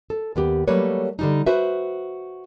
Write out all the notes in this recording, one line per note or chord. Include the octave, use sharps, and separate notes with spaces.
A4
D#2 B3 G4
F#3 G3 A3 A#3 B4 C#5
D3 G3 D#4
F#4 B4 C5 E5